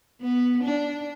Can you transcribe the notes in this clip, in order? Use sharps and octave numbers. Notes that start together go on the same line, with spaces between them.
B3
D4